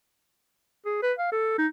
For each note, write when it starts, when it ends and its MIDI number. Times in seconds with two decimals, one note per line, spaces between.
0.85 1.02 68
1.02 1.13 71
1.18 1.32 77
1.32 1.54 69
1.58 1.67 63